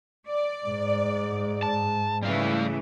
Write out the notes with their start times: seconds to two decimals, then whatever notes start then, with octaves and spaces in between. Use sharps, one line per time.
0.28 D5
0.66 G#2
1.63 A5
2.23 C#3 E3 G3 A3 F5